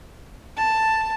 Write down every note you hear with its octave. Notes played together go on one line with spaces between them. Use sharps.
A5